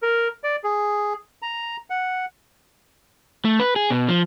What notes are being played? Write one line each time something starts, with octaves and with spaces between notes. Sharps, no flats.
A#4
D5
G#4
A#5
F#5
A3
B4
G#4
B2
F3